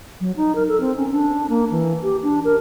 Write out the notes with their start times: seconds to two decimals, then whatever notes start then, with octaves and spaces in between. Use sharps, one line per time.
0.20 F#3
0.37 D#4
0.55 A#4
0.68 A4
0.81 C4
0.97 C#4
1.12 D4
1.50 A#3
1.71 E3
2.03 G4
2.23 D4
2.45 A#4